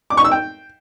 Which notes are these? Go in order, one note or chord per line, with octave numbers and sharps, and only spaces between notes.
D6
C#6
E6
G5